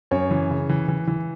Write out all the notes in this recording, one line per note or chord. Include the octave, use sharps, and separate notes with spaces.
F#2 C#5
E3
C#3
E3
E3
E3